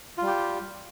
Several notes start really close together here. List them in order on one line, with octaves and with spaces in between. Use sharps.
F4 G3 G4